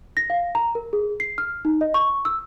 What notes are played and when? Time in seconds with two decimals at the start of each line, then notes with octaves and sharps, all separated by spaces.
0.17 A#6
0.30 F5
0.55 A#5
0.75 A#4
0.93 G#4
1.20 C7
1.38 F6
1.65 D#4
1.81 D#5
1.94 C#6
2.25 E6